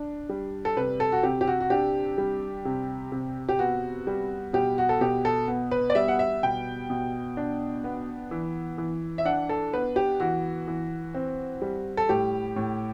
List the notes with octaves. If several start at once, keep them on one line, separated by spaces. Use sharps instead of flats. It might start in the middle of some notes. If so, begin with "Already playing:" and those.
Already playing: D4
G3
A4
C3 B4
A4
F#4
C3 G4
G4
F#4
F#4
D4 G4
G3
C3
C3
G4
B3 F#4
G3
B2 G4
F#4
A4
B2 G4
A4
B3
B4
D5
G3 E5
F#5
E5
B2 G5
B2
D4
B3
E3
E3
E5
D4 F#5
A4
B3 B4
G4
E3 F#4
E3
C4
G3
A4
A2 G4
A2